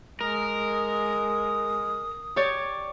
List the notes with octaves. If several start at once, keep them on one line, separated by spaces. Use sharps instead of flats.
G#3 A#4 D#6
G4 C#5 D5